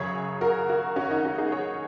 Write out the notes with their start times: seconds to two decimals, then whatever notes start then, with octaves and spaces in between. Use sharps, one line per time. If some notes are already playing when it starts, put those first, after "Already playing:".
Already playing: F#2 C#3 F#3 G#4 C#5
0.41 F#4 A#4
0.69 F#4 A#4
0.96 C#4 F#4
1.11 D#4
1.25 C#4 F#4
1.38 D#4 G#4
1.51 G#4 C#5